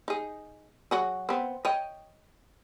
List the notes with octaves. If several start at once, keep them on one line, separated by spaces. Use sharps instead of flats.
D#4 G#4
F#3 F#4 G#4
B3 C4
C#5 D#5 G5